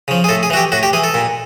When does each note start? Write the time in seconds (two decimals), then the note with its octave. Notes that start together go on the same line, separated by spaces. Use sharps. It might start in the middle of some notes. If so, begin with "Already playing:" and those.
0.08 C#3 F3
0.24 G#4
0.29 A2 A4
0.43 G#4
0.50 E3 F#4
0.57 G4
0.72 A2 F#4
0.83 G4
0.93 E3 G#4
1.04 A4
1.14 A#2